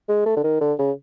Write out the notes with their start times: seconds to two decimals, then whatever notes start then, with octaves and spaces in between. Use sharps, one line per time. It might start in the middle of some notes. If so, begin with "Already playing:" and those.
0.09 G#3
0.26 A3
0.37 D3
0.44 D#3
0.61 D3
0.79 C#3